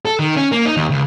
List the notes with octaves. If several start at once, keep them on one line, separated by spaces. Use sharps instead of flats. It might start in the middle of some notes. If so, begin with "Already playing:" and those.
A4
D#3
C#4
A#3
D#4
D#2
C#2